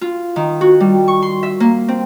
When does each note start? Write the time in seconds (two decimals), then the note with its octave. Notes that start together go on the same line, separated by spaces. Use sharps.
0.01 F4
0.36 D#3
0.61 F#4
0.80 G3
1.08 C#6
1.22 C6
1.43 E5
1.60 A#3
1.88 C4